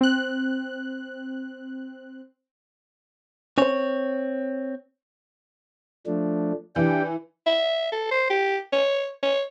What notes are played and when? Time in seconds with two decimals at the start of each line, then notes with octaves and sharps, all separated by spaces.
0.01 C4 F#6
3.58 C4 C#4 C5 C#5
6.07 F3 A3 D4
6.76 E3 D4 G4 G5
7.46 E5
7.92 A4
8.11 C5
8.30 G4
8.73 C#5
9.23 C#5